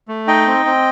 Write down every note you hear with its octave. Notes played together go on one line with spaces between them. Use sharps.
A3
D#4 D#5 G5
C4
C4